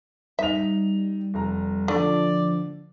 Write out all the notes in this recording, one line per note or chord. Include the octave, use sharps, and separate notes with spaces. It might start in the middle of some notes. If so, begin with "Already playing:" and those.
G3 D#4 E5 F7
F1 A#5
D3 F3 A3 D5